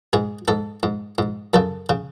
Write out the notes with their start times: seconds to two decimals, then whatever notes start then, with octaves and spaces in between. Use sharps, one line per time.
0.13 G#2 G#4
0.48 G#2 A4
0.83 G#2
1.18 G#2
1.54 F#2 C#3 A4
1.89 C#3